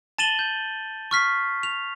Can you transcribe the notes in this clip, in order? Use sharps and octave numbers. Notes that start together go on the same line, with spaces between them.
A5 A6 D#7 E7 F#7 G7
G6
C#6 F6 B6 C7
F7